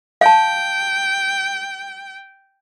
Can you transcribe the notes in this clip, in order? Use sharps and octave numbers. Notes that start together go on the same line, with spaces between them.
F5 G5 A5